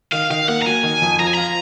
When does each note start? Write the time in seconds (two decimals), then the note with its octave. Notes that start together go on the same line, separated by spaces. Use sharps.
0.12 D#3 F5
0.30 D#3 F5
0.48 A#3 F#5
0.62 A#5
0.66 F#3 G#5
0.83 D#3
1.02 F2
1.19 F3 A#5
1.27 G#5
1.33 F4 A#5